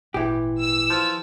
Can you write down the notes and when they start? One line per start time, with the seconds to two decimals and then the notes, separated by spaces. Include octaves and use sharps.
0.14 G#1 A#2 E3 G4
0.60 E6
0.90 F3